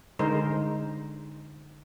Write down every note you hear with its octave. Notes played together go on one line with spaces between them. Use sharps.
D3 G#3 D#4 A#4 C5